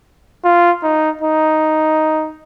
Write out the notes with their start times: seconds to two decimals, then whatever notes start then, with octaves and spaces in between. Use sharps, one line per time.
0.44 F4
0.83 D#4
1.22 D#4